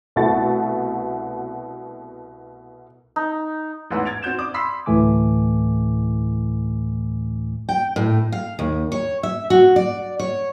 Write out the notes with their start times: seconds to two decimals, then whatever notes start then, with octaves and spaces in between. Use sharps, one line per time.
0.16 C2 B2 A3 F#4 C#6 A6
3.16 D#4
3.90 A1 E2 G#2 B4 F#5 E6
4.05 G#6 A6 D7 F7
4.23 C4 F#4 G6 E7
4.39 D5 D6 D#6
4.54 B5 C6 E6 B6 C7
4.86 D2 A2 E3 A3 G#5 D6
7.69 G5
7.96 A2
8.32 F5
8.59 D#2
8.92 C#5
9.23 E5
9.50 F#4
9.76 D5
10.19 C#5